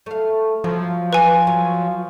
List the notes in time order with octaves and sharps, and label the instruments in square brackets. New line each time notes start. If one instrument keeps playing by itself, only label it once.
[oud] A3 F5
[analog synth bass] F3 [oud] F#3
[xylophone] B4 G#5
[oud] F#3